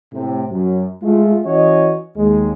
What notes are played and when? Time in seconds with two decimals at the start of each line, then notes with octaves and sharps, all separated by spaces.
0.13 A2 C3
0.51 F#2 F#3
1.02 G#3 A3 F4
1.45 E3 C#4 F#4 C#5 D#5
2.16 D#2 G#3